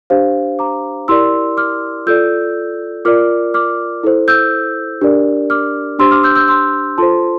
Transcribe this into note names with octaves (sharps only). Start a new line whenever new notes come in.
D4 G4 C5 F5
A#5 D6
E4 G4 A#4 D5 C6 E6
D6 F6
F4 A4 D5 E6 G6
F4 A#4 D5 D6 F6
D6 F6
E4 A4 C5
E6 G6
D4 G4 A#4 D5
D6 F6
D4 G4 C5 C6 E6
D6 F6
E6 G6
E6 G6
C6 E6
F4 A4 C5 A5 C6